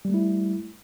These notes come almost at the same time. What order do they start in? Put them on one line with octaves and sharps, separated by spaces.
G3 A3 E4